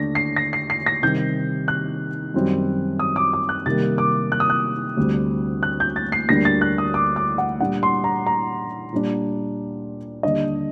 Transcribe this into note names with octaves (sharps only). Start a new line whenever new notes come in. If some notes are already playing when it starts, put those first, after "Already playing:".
Already playing: D#2 D3 A3 D4 A#6
C7
A#6
C7
C7
A#6
C3 D#3 G3 C4 G6
F#6
F#2 D#3 G3 C4
D#6
D6
D6
F#6
C3 D#3 G3 A#3 A6
D6
F#6
D#6
F#6
D2 D3 G3 C4
F#6
G6
A6
C7
D2 D3 G3 A#3 D4 A#6
A6
F#6
D#6
D6
D6
F#5
A#2 G3 D4 F#5
C6
A#5
A#5
A#2 G3 D4
D#2 D3 G3 D4 D#5